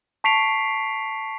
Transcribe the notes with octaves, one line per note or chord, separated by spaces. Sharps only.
A5 C#6 B6 C7 D7 F7